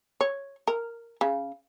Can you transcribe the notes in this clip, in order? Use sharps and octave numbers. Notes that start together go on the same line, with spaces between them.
C#5
A#4
C#3